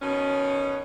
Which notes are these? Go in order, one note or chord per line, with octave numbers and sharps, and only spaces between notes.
B2 D#3 C#4